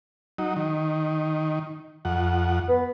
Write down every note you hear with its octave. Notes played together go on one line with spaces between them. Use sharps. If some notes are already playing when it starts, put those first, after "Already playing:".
F#3 D#4
D#3
F2 F#5
B3